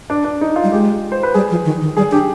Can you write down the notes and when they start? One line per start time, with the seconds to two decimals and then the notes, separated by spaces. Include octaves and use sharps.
0.10 D4
0.24 D4
0.41 D#4
0.56 F4
0.64 G3
0.72 G#3 G4
1.12 C5
1.23 B4
1.34 G3 G#4
1.50 F3
1.65 D#3
1.81 D#3
1.97 G3 G#4
2.12 D4 G4